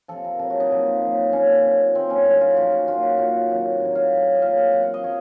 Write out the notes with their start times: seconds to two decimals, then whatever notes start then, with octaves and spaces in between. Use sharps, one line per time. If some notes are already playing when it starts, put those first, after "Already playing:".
0.08 C3 F3 A4
0.24 A#4
0.39 C3 F#3 A4
0.50 F#4
0.60 D#4
0.71 A#2 F3
1.02 A#2 F#3
1.32 A#2 F3 C#4
1.63 C3 F#3
1.94 A#2 F#3 C4
2.10 C#4
2.25 A2 F#3 D#4
2.41 F4
2.56 A#2 F3 F#4
2.72 F#4
2.87 A#2 F#3 F4
3.03 F#4
3.18 A#2 F#3 F#4
3.50 C3 D#3 F#3
3.80 A2 F#3
3.95 F5
4.11 C3 F#3
4.35 D#5
4.42 A#2 F#3 F5
4.58 F#5
4.73 C3 F#3 F#5
4.83 F5
4.94 D#5
5.04 F#3 C#5